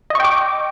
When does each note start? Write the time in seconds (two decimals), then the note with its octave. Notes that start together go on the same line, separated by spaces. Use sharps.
0.10 D#5
0.15 C#6
0.20 G5
0.24 D6